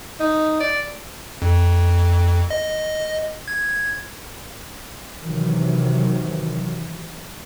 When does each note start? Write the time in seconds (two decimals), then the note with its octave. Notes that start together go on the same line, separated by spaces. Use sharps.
0.20 D#4
0.60 D5
1.42 F2
2.51 D#5
3.48 G#6
5.24 C3 D#3 E3 F#3